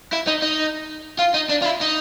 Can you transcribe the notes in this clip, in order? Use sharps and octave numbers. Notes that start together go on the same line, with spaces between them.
E4
D#4
D#4
F4
D#4
D4
F4
E4
D#4